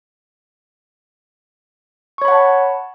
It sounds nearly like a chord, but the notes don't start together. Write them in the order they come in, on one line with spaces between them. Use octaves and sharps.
C#6 C#5 B5 F#5 A5